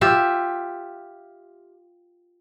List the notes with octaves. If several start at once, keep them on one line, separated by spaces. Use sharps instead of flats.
F4 G4 E5